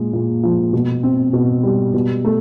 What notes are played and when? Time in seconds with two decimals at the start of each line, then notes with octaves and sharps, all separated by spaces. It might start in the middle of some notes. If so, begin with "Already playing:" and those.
Already playing: A#2 G#3
0.13 A#2
0.43 F3
0.73 B2
1.03 C4
1.33 B2
1.63 G3
1.94 B2
2.25 A3